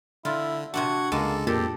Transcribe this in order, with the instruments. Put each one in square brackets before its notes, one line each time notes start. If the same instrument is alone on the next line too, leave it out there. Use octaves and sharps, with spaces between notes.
[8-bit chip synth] D3 [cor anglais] E4 [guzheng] F4
[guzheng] C3 C4 D4 [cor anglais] F#4 [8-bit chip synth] F#5 G#6
[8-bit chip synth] C#2 A4 [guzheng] G#3 A5 [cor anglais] A#3
[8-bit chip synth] F2 [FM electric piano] A#2 [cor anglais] G4 [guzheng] A4